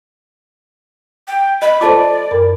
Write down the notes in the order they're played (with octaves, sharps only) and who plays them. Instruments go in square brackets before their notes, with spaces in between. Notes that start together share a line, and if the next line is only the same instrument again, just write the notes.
[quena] G5
[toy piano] D#5 [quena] B5
[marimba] F4 A4 C5 [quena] D5 [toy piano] A5 D6
[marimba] F#2 A#4 B5